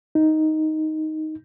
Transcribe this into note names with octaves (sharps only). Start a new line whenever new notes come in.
D#4